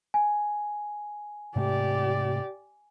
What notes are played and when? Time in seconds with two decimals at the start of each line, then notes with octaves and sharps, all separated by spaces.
0.14 G#5
1.56 G#2 C3 A3 G4 D5